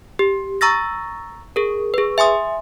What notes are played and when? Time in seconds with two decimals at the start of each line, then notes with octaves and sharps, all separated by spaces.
0.19 G4
0.61 A#5 C#6 E6 A6 A#6
1.56 G#4 A#4
1.94 G#4 B4
2.18 E5 G#5 C6 D#6